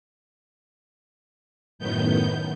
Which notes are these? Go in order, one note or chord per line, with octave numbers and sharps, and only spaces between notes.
F#2 A2 D#3 B3 G6